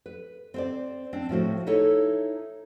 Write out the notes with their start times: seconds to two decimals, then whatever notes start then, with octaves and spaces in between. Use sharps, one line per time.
0.06 B4
0.54 C4 C5 D5
1.13 C4 D4
1.29 A2 F3 F#4 C5
1.67 D#4 E4 A4 C#5